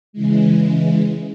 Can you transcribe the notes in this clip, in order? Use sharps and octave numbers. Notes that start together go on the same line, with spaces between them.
C#3 E3 G#3